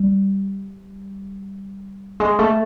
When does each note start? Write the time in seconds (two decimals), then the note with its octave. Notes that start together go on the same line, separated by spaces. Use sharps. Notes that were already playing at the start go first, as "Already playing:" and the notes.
Already playing: G3
2.20 G#3
2.39 A3